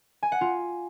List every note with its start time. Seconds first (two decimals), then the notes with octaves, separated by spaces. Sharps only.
0.23 G#5
0.32 F#5
0.41 F4